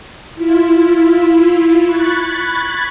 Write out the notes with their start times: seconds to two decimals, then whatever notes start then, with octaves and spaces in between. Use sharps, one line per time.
0.35 E4 F4
1.84 B5 C#6 F#6 G#6 A6